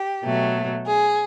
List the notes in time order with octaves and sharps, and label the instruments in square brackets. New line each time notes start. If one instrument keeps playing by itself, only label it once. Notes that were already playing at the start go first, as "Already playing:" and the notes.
Already playing: [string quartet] G4
B2 F#3 A3
G#4